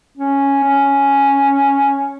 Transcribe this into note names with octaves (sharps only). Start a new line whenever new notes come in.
C#4
C#4